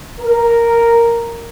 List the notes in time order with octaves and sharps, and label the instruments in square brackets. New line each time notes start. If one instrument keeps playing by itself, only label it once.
[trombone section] A#4